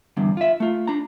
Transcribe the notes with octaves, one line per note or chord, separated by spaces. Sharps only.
E2 G2 D3
F4 E5
A3 F4
D4 A#5